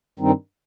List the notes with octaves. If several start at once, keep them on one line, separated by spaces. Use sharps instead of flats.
G2 D#3 G3 C4 D#4